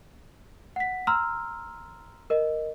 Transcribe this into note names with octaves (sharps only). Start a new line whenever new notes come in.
F#5 B6
A#5 C6 E6 F6
A#4 D#5